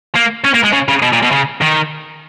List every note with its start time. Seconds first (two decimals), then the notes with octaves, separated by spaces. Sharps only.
0.15 A#3
0.44 C#4
0.54 A#3
0.64 G#3
0.73 C#3
0.88 C#3
1.02 B2
1.13 A#2
1.22 B2
1.31 C#3
1.61 D#3